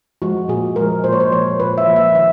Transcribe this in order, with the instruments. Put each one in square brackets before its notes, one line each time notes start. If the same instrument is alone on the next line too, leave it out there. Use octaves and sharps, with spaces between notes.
[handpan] F3 G#3 F#4
A#2 G#4
F3 G#3 A#4
A#2 C5
C#5
C5
F3 A#3 C#5
A#2 B4
E5
F3 A#3
E5
D#3 E5